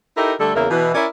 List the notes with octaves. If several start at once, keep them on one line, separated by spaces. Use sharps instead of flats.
D#4 E4 G4 A4 A#4
D3 G3 A3 A4
E2 C#3 A#3 A#4 E5
B2 E3
C#4 E4 A#4 D5